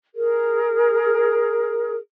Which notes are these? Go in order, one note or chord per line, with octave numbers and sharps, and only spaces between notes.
G#4 A#4